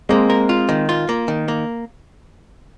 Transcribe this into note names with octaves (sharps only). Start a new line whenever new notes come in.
G#3 A#3 C4
A#4
F4
D#3
F4
A#3
D#3
A#3